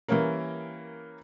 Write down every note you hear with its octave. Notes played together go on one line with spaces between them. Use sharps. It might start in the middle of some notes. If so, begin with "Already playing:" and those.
E3 G3 A#3 C#4 A#4